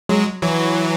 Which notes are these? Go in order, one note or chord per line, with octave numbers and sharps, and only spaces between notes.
F#3 G#3
E3 F#3